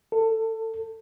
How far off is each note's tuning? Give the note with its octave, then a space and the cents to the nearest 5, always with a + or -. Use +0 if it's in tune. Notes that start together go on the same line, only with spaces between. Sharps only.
A4 +20